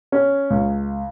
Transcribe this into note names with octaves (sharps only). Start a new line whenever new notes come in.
C#4
C#2